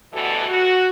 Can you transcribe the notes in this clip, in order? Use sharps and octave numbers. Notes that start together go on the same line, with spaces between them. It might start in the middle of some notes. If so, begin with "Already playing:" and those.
D2 B2 E3 G3 F#4 A4
F#4